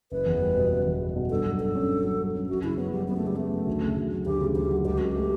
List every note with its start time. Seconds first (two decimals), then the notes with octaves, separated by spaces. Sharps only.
0.12 F#1 B4
0.26 E2
0.42 G3
0.57 B2
0.72 F#1
0.85 E2
1.00 G3
1.16 B2
1.30 G2 A4
1.45 F#3
1.60 G2 A4
1.75 C#4
1.89 G2
2.04 F#3
2.19 G2
2.34 C#4
2.49 F#2 F#4
2.63 C#3 E4
2.78 F#3 B3
2.93 F#3 G3
3.08 F#2 B3
3.17 A3
3.22 C#3 G3
3.36 A3 B3
3.52 F#3
3.67 D2
3.82 C#3
3.96 D2
4.12 F#3
4.26 D2 G4
4.41 C#3
4.55 D2 G4
4.70 F#3
4.85 C#2 G4
4.98 C#3 F#4
5.09 G4
5.16 A3